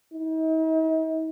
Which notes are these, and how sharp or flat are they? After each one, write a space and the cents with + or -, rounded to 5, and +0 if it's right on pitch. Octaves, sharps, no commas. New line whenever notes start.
D#4 +45